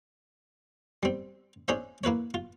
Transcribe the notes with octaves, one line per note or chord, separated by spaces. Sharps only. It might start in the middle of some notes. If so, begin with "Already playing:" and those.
G3 C4
C#4 D4 G#4 C5 E5
A#3 E4 B4 C#5
F4